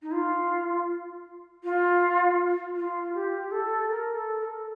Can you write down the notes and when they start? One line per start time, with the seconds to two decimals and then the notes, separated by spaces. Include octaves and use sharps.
0.02 D#4
0.12 F4
1.64 F4
2.76 F4
3.14 G4
3.51 A4
3.90 A#4
4.14 A4
4.41 A#4
4.45 A4